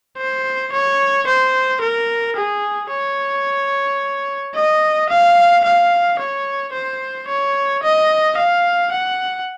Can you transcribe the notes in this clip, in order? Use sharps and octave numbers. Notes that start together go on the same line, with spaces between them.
C5
C#5
C5
A#4
G#4
C#5
D#5
F5
F5
C#5
C5
C#5
D#5
F5
F#5